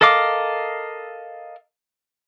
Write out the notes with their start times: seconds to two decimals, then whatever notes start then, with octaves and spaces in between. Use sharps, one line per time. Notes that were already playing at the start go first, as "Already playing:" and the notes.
0.01 A4 A#4 D#5 F5 D6